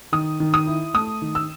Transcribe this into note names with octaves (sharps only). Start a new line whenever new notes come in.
D#3 D#6
D#3
D#6
E4
A3 D#6
D#3
E6